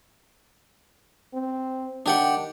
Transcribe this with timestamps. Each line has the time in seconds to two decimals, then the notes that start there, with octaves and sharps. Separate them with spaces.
1.34 C4
2.06 D#3 D4 G4 F#5